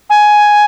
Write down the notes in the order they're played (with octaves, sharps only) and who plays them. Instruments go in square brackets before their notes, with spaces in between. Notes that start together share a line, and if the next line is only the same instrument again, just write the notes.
[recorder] G#5